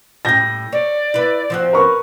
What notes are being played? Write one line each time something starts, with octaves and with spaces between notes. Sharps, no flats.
A2 G3 G6 A#6
C#5 D5
E4 B4
F3 C4 F#4
A#4 B4 C#6